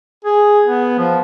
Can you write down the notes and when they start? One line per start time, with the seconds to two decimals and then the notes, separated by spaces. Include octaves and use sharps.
0.25 G#4
0.64 B3
0.99 F3